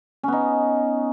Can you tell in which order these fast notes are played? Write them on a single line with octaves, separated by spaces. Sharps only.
C#4 B3 D#4